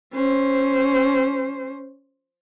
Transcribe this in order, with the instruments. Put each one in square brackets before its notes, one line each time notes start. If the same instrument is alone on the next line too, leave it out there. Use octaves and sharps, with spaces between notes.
[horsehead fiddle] C#4 C5